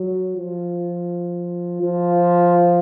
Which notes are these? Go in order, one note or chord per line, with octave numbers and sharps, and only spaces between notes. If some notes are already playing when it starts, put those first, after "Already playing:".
Already playing: F#3
F3
F3